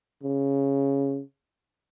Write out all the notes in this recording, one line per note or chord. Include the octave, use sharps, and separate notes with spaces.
C#3